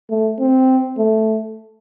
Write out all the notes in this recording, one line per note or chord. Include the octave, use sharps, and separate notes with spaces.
A3
C4
A3